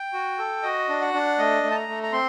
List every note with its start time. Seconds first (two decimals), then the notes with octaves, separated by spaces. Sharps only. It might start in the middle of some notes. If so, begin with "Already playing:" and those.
Already playing: G5
0.13 F#4
0.39 A4
0.63 F#4 D#5
0.89 D4
1.01 F#5
1.14 D4
1.38 A3 D#5
1.63 A3
1.71 A5
1.75 A#5
1.88 A3
2.03 A#5
2.12 C4 C6